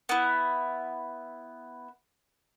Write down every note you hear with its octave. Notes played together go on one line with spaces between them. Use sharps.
B3 E4